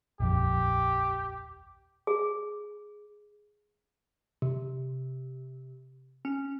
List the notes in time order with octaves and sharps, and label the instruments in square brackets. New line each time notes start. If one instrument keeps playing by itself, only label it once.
[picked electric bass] D#1 A#1 F2 [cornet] G4
[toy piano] G#4
[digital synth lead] C3
C#4